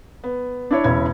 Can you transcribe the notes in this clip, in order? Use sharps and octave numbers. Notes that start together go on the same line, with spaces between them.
B3
D4 E4 C#5
E1 C#3 E4 C#5 G#6